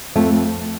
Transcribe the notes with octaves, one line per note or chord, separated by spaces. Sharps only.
F2 A3